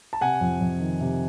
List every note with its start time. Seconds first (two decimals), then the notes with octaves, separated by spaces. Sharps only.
0.13 A5
0.21 C3 F#5 G#5
0.41 F2
0.61 F2
0.80 D#3
1.00 C3